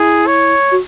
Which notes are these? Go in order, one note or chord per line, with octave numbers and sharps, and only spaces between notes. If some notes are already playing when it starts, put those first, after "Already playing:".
Already playing: E4 G#4
C#5
F#4